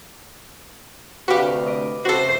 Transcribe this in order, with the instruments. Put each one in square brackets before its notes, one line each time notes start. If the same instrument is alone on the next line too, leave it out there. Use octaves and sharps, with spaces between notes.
[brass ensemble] D2 C3 [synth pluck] F#4 G4 [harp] B4 F5
[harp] D#5 D6
[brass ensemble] C#3 C4 E4 [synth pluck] F#4 A4 [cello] C5